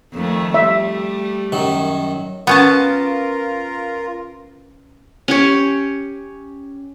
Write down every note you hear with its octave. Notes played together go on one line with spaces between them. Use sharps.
F2 D#3 A3
G3 A3 E5
F#2 D#3 F#3
B3 C#4 F4 A#4 A5
C#4 G4 C#5